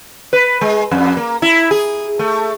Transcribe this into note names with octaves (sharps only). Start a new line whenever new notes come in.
B4
G#3
F2
A#3
E4
G#4
A3